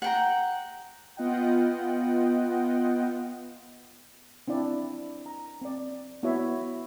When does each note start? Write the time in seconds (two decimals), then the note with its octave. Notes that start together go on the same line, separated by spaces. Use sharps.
0.02 F#5 G5 A#5
1.17 B3 F4 D#5 F#5 G5
4.48 C4 D4 E4 D5
5.26 A#5
5.61 C4 D5
6.23 B3 E4 F#4 C#5 E5